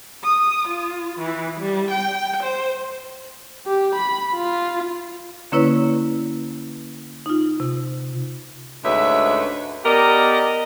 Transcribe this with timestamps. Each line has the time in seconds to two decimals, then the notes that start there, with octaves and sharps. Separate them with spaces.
0.23 D#6
0.68 F4
1.18 E3
1.59 G3
1.90 G5
2.42 C5
3.67 G4
3.96 B5
4.35 F4
5.52 D3 A#3 C#4 E4 B4 C#5
7.26 D#4 F4
7.60 C3
8.84 D2 G#2 C#4 B4 E5
9.84 B3 G4 A#4 D5 D#5